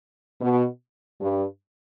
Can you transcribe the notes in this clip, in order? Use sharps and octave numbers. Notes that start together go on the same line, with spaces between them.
B2
G2